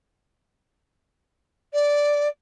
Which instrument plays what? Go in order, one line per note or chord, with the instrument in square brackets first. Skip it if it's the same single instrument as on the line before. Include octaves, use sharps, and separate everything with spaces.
[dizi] D5